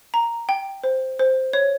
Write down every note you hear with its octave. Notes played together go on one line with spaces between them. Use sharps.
A#5
G5
C5
C5
C#5